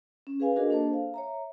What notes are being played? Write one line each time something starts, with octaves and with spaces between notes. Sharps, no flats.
C#4
G#4 B4 F5 G#5
D4 F#4 G#4 A#4 D#5
A#3 D4 A4 C5 A5
F5
C#5 E5 A#5